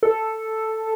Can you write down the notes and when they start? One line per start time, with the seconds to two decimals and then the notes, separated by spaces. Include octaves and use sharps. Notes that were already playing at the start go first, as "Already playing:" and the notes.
0.03 A4